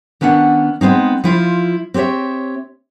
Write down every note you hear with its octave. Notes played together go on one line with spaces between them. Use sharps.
D#3 B3 C#4 D4 F#5
G#3 B3 C4 D#4
F3 E4 F4
C4 G4 C5 C#5 E5